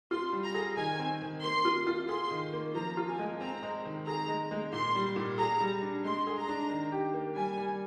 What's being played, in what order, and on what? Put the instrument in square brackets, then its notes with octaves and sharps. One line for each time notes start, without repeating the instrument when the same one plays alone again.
[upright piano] F4 [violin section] C6
[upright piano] G3
[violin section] A#5
[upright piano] G#4
[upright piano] D#3 [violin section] G#5
[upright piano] C4
D#3
[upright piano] A#3 [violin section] C6
[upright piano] F4
F4
[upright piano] G#4 [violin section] C6
[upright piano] D#3
A#3
[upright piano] F3 [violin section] A#5
[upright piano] F4
[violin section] G#5
[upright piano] G#3
[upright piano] C4 [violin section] A#5
[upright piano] G#3
D#3
[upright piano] G#4 [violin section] A#5
[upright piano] G#3
G#3
[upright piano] A#2 [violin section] C6
[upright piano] G3
A#2
[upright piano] G#4 [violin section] A#5
[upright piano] G3
D4
[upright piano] G#3 [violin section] C6
[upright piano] G#4
[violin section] A#5
[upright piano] D4
D#3
G4
A#3
[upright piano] G3 [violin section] G#5
[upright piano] G3